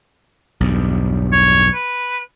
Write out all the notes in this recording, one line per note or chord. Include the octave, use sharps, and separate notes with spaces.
B1 E2 G2
C#5
B4